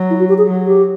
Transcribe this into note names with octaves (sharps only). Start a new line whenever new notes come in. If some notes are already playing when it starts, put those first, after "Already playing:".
Already playing: F#3
E4
F#4
G4
G#4
F#3
G4